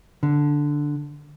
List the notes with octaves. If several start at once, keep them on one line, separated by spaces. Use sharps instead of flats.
D3